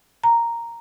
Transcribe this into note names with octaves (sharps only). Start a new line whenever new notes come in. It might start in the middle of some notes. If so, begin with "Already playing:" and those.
A#5